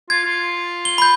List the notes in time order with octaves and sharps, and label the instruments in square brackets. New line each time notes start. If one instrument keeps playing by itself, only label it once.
[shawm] F4 [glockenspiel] G#6
[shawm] F4
[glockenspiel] G7
B5 G6